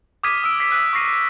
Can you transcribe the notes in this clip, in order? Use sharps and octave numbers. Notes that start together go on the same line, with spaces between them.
D6 D#6 F6 G#6 B6 D#7
D#6 E6 D7
B6 C7
F#6 B6 D#7
C#6 F6 A#6 C7 D7 D#7